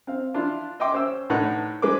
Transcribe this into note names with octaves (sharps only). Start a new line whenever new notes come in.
C4 F5
D4 E4 F4
D#5 E5 G5 C6 D6
C#4 C5 E6
A2 D4 D#4 B4 F#5
G#3 B4 C5 D6